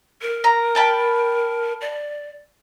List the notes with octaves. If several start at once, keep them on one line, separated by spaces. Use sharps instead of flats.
A#4
A#5
G5 A5 B5
D5